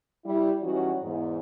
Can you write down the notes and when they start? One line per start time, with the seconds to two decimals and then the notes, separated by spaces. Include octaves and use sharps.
0.24 G3 E4
0.62 E3 F#3 G3 C#4 D#4 F#4
1.02 E2 G#2